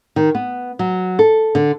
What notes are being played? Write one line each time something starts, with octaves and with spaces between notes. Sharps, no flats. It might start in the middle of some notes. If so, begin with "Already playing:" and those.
D#3
B3
F#3
A4
D3